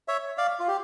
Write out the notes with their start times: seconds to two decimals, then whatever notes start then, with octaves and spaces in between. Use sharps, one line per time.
0.08 C#5 E5
0.38 D5 F5
0.60 F4
0.68 G4